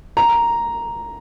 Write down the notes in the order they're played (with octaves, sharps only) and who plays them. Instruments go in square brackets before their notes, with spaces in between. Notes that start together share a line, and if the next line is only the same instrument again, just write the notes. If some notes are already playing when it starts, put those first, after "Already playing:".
[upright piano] A#5